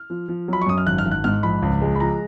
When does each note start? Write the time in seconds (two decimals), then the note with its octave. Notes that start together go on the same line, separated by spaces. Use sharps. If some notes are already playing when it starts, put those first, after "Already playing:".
Already playing: F6
0.10 F3
0.28 F3
0.48 F#3 B5
0.61 C#6
0.66 F#2 D#6
0.78 F6
0.86 G#1 F#6
0.98 F6
1.06 G#1
1.11 F#6
1.24 G#2 F6
1.43 A#1 B5
1.62 C#2
1.82 G#3
1.95 B5
2.00 F3 A#5